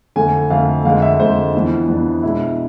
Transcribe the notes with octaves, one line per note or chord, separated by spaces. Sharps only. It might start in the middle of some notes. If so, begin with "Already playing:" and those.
F2 D3 A3 G#5
F2 D3 A3 F5
F2 D3 G#3 F5
E5
F2 D3 G#3 C5
F2 E3 B3 D4
F2 E3 B3 D4
B2 G#3 D4 E4